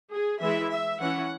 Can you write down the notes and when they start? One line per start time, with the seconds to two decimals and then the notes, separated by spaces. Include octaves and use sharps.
0.11 G#4
0.41 E3 G#3 E4 E5
0.71 E5
1.00 E3 C#4 E4 F#5